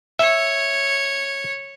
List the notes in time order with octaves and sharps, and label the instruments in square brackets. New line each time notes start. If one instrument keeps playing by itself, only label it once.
[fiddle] C#5 [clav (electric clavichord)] E5